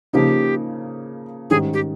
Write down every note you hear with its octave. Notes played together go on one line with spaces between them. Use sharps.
C#3 F3 A#3 D#4 G4
G#2 D#3 G3 C#4 G#4
G4